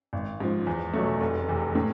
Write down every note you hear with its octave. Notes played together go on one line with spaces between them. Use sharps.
G#1
G#2 F3
E2
B2 F#3 A3
F1
E2 C3
A2